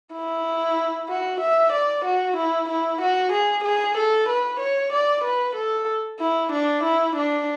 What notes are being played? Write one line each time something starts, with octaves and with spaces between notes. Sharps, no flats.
E4
F#4
E5
D5
F#4
E4
E4
F#4
G#4
G#4
A4
B4
C#5
D5
B4
A4
E4
D4
E4
D4